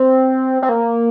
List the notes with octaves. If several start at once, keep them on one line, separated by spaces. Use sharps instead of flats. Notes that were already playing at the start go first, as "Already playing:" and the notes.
Already playing: C4
C4
A#3